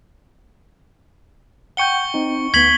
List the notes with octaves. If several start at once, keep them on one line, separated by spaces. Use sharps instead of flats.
F#5 G5 C#6 G6 C#7 G7
C4 D#4
D2 B3 G#6 B6 F#7 G7